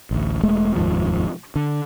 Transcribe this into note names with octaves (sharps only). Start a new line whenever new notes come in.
A1 D2
E1 G#3 A3
F1 D#2 G#2 F3
D3